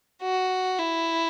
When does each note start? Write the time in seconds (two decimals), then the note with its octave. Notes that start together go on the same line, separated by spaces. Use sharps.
0.23 F#4
0.78 E4